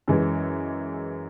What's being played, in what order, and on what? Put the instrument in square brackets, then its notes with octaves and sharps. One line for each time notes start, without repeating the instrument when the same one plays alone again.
[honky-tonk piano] F#2 E3 G#3